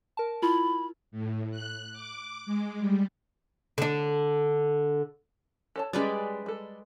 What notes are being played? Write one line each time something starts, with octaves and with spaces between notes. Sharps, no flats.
A#4 A5
E4 F4 B5
A2
F#6
D6
G#3
G3
D3 D4
A4 C#5 A5
G3 G#3 C#4 G4 B4 D5
G3 A4